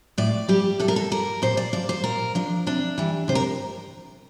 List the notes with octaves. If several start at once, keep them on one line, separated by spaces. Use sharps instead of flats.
A2 D5
G3 G4
A2 A4
A#4
A4
G3 A#4
A#2 C5
D5
F3 D5
C5
A#2 A#4
F3 D4
C3 D4
E3 G3
C3 C5
A#4